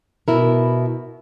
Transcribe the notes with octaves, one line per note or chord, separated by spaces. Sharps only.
B2 E4 A#4